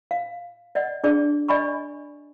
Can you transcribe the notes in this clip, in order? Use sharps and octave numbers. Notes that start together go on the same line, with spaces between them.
F5
D5 D#5 F#5
D4 G#4 D5
D5 D#5 G#5 B5 C#6